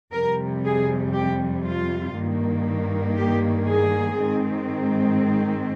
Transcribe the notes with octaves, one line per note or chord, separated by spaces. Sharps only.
F2 C3 G3 A#4
G#4
G4
F4
G2 D#3 A#3
G4
G#4
G#2 D#3 G#3 C4